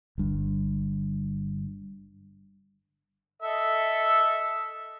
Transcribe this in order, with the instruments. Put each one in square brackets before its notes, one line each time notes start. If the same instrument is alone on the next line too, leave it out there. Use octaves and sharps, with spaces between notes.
[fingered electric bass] G1 G2
[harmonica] A4 D#5 E5